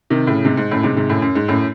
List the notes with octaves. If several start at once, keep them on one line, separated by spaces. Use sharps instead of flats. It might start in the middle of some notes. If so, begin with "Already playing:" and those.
C3 D#3
A2 C#3
G#2 C3
G#2
F#2 A2
G#2 C3
G#2 C3
F#2 A2
F#2
G#2
F#2 A2